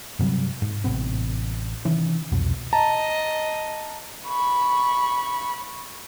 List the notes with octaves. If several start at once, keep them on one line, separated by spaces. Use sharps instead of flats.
G2 C3 F#3 G3
G#2
A1 C3 B3 C4
C3 D#3 E3 C#4
C2 F2 B2
D#5 A5 A#5
B5 C#6